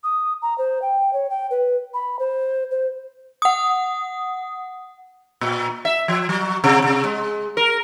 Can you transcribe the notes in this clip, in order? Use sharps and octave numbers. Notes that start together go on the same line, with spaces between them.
D#6
A#5
C5
G5
C#5
G5
B4
B5
C5
C5
F#5 D#6
A#2
E5
F3
F#3
C3
C3
G#3
A#4